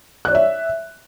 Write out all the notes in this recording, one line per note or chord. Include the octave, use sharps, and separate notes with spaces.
C#5 D5 E5 F#6